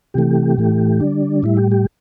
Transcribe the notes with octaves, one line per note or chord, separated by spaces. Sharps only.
C3 E3 A3 G4
A2 E3 A3
D3 G3 D4
A2 G3 E4
G4
G4